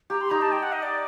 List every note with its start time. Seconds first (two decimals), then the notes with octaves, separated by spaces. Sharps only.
0.10 G4 A#5
0.21 C6
0.30 D#4 G4 A#5
0.42 A5
0.52 G5
0.63 F#5
0.73 D#5
0.83 D5